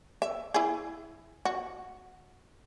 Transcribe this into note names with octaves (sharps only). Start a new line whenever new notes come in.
E5
E4 G#4
F#4